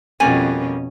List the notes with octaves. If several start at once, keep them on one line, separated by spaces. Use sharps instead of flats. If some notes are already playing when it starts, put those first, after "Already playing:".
F2 B2 G3 A#3 C#4 G#5